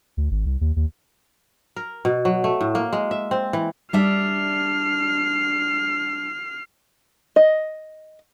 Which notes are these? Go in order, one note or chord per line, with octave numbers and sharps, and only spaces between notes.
D2
G#1
C2
D#2
D#2
A#4
B2
F#3
A3
A2
A#3
G#3
E5
C4
E3
G3 D4 E5 F6 C7
D#5